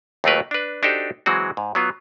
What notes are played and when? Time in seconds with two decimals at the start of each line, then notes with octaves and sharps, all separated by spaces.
0.24 D#2 F#3 A3 F4 A#4 B4
0.51 D4 B4
0.83 D4 D#4 F#4 G4 A4 C5
1.26 E3 F#3 G#3 C4 F#4
1.57 G#2
1.75 F#3 B3 F4